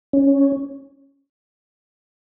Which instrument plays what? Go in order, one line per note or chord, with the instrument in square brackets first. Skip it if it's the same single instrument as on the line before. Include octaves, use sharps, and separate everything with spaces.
[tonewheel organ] C#4